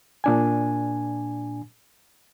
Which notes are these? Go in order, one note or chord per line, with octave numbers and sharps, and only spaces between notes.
A#2 D4 G#5